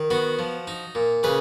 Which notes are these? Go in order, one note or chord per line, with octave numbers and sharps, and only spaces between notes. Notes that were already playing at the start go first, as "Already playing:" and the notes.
Already playing: D#3
B3 F#4
F3
D#4
A#2
C#3 G#4 B4